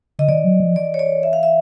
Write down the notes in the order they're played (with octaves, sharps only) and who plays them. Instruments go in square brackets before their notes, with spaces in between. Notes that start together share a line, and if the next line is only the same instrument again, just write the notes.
[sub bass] D3 [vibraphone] D#5
[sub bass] D#3 [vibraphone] D5
[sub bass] F#3
F3
[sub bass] E3 [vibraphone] D5
[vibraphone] C#5
D5
E5
F5
E5